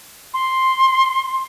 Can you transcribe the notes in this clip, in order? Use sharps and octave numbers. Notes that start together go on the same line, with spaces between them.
C6